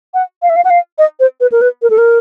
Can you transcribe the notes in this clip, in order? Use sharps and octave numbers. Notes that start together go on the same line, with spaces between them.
F#5
F5
E5
F5
F#5
F5
D#5
C5
B4
A#4
B4
A#4
A4
A#4